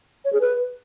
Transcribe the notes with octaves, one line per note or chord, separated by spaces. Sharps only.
C#5
G#4
B4